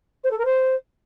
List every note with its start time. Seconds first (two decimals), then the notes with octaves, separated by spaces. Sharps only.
0.24 C5
0.31 A4
0.38 A#4
0.45 C5